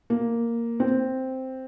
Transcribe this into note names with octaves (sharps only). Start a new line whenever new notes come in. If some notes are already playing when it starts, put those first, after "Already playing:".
A#3
C4